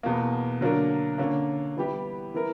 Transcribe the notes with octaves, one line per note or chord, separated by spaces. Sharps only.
E2 B2 A#3
D3 F#3 A#3 D4 A#4
D3 A#3 C#4
E3 G3 B3 E4 G4
E3 B3 E4 A#4